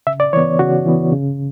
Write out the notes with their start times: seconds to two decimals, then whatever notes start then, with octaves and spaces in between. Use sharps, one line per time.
0.07 C#3 E5
0.20 D5
0.33 E3 B3 C#5
0.59 C#3 F#4
0.86 E3 B3
1.12 C#3